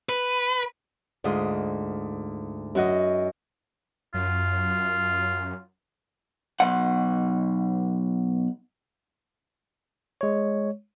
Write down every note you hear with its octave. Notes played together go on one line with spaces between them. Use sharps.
B4
D2 G#2 F4 D#6
F#2 F#4 D#5
F#2 F4
B1 F#5
G#3 C#5